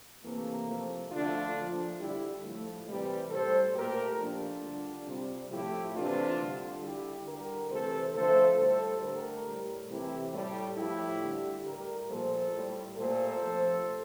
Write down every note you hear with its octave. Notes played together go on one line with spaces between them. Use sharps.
C3 E3 A3 A#3
C3 F3 A3
D3 F3 A3 D4 F4
A#2 F3 A3
D3 G3 E4 G4
A2 F3 A3
C3 E3 G3
A2 G3 A4 C5
A#2 A3 G4 A#4
A#2 F3 A3 D4 F4
D3 G3
C3 G3
A2 F3 A3 E4 G4
C3 E3 A3 D4 F4
D3 G3
D3 G3 E4 G4
D3 G3 G4 A#4
C3 E3 A3 A4 C5
D3 F3 A3 A4 C5
A2 G3 A4 C5
D3 A3 G4 A#4
A2 G3
C3 E3 A3 E4 G4
A2 G3
A2 F3 A3 E4 G4
D3 G3
A2 G3 G4 A#4
A#2 F3 A3 A4 C5
A2 G3
A#2 A3 A4 C5
C3 F3 A3